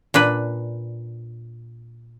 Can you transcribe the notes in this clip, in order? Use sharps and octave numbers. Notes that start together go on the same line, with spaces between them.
A#2 D4 B4